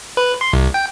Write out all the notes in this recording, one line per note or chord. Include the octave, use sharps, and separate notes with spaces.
B4
C6
C2
G5